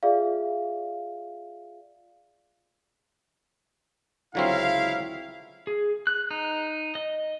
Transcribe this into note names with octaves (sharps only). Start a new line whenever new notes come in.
F4 G#4 D5 E5 F5
C#2 D3 F#3 C4 E4 F5
G#4
F#6
D#4
D#5